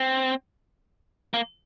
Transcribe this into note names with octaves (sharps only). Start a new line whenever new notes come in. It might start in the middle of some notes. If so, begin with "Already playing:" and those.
Already playing: C4
A#3